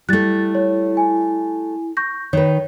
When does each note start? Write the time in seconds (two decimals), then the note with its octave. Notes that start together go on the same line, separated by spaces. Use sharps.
0.09 G3 A3 E4 F#6 A6
0.55 C#5
0.97 G#5
1.97 C#6 G6 A#6
2.33 D#3 B4 C#5